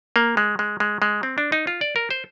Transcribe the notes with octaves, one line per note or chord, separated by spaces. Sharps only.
A#3
G#3
G#3
G#3
G#3
C4
D4
D#4
F4
D5
A#4
C5